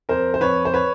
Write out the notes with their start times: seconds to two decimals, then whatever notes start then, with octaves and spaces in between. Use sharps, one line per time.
0.09 F2 A#4 C5
0.34 C5
0.41 F2 B4 C#5
0.65 C5
0.74 B4 C#5